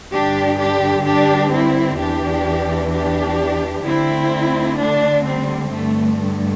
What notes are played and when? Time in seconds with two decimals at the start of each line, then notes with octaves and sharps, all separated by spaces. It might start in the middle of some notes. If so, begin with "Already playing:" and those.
0.12 G2 D3 D4 G4
0.59 D4 G4
1.06 D4 G4
1.52 C4 E4
1.99 E2 E3 D4 G4
2.92 D4 G4
3.84 D2 D3 C4 E4
4.78 A3 D4
5.24 G3 C4
5.70 G2 D3 A3
6.17 A3